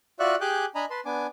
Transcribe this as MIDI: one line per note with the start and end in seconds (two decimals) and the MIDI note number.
0.20 0.36 65
0.20 0.36 66
0.20 0.36 74
0.20 0.36 76
0.20 0.36 85
0.20 0.36 90
0.41 0.65 67
0.41 0.65 68
0.41 0.65 80
0.41 0.65 86
0.41 0.65 90
0.41 0.65 91
0.75 0.85 62
0.75 0.85 75
0.75 0.85 80
0.75 0.85 82
0.75 0.85 83
0.90 1.00 71
0.90 1.00 81
0.90 1.00 84
1.05 1.27 59
1.05 1.27 62
1.05 1.27 80
1.05 1.27 86